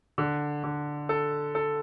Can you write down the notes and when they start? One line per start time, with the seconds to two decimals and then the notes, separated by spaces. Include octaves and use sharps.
0.18 D3
0.64 D3
1.09 A4
1.55 A4